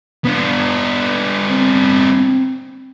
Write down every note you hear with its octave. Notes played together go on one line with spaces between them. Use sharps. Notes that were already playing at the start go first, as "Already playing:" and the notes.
B3 D4
C4